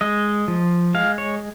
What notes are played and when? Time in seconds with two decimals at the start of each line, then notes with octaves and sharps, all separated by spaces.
0.01 G#3 D#5
0.48 F3
0.94 G#3 F5
1.18 C#5